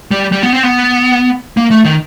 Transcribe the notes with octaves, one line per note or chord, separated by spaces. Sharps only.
G3
G3
B3
C4
B3
A#3
A3
D#3